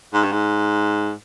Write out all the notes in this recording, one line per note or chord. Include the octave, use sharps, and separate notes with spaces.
G#2
G2
G#2